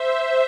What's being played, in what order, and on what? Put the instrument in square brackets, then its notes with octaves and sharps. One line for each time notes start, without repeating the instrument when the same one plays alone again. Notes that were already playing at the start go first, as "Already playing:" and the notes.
Already playing: [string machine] C5 E5